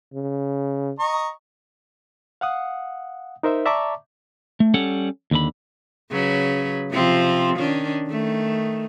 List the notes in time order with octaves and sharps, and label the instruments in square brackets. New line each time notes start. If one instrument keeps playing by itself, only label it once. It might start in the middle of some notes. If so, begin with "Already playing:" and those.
[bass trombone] C#3
[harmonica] D#5 A#5 C#6
[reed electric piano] F5 F#5 D#6
D#4 A#4 C5 E5
D5 E5 A5 A#5 C#6 D6
[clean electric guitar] A3
G3 C#4 A4 C#5 F#5
D#2 D3 B5
[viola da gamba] C#3 F#3 B4
C3 F3 C4
D#3 C#4 D4
D#3 A3